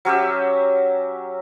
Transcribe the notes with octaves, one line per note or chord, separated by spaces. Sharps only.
F#3 C#4 G4 E5